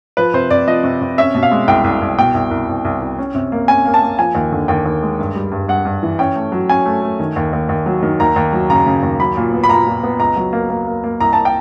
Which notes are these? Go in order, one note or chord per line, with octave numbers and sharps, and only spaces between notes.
F3 B4
C3 C5
C3 D5
F3 D#5
C3
C3
C#4 E5
B2
F5
G#3
C2 G5
C2
C2
B2 G5
C2
C2
C2
C2
C2
C#4
C3
A#3
C#4 G#5
A#3
A5
A#3
F3 G#5
D#2
D3
D#2 G5
D#2
G#3
G2
G3
G2
G2 F#5
G2
E3
C#4 G5
A3
F#3
C#4 G#5
A3
A3
D#3
D#2
D#2
D#2
F#3
D#3
D#2 A#5
D#2
F#3
C#3 A#5
C#3
D#2
F#3 B5
A#2
B3
B5
A#2 A#5
A#2
B3
C#2 A#5
F#3
A#3
A#3
A#3
A#3
C2 A#5
A5
G5